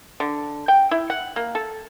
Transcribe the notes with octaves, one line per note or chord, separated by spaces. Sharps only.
D3
G5
E4
F#5
A#3
A4